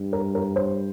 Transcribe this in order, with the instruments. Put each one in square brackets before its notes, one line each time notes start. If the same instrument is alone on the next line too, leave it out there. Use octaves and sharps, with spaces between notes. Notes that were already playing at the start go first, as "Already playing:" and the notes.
Already playing: [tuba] G2
[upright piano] A#4
A#4
C5